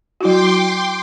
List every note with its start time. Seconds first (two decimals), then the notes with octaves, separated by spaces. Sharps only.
0.21 F#3 E4 F#4 G5 C6 D6